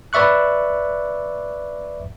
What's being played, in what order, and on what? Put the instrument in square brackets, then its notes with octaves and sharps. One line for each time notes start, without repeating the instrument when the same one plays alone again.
[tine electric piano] B4 D5 E5 C#6 F#6